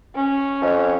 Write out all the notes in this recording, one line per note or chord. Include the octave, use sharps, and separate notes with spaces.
C#4
F2